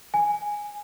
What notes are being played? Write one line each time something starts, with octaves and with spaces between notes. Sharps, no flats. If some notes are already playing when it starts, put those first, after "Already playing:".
G#5